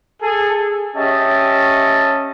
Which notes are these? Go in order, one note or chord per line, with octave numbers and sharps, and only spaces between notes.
G#4 A4
C#4 G4 D#5 E5 A5